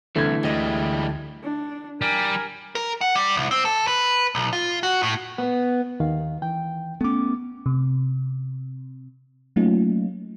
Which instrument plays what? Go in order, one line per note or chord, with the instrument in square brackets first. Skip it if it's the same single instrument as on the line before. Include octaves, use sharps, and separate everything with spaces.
[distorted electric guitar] C2 [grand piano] D3 G#6 [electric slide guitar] E3 A3
[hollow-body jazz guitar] D2 D#5 [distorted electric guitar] G3 G#3
[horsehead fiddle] D4
[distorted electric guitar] G3 [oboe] A#4 [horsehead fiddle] G#5
[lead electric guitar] A#4
F#5
G3
C2
C4
A4
B4
B1
F4
F#4
A2
[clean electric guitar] B3
[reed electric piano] D#2 D#3 F5
E3 G5
[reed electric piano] A3 D6 [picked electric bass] B3 C#4
[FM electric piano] C3
F#3 A3 A#3 C#4 D#4 F4